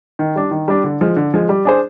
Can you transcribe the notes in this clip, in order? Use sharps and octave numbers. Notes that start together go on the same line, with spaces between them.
D#3
G3 D4
D#3
G3 D4
D3
F3 G#3
D3
F3 G#3
G3
D4 G#4 C5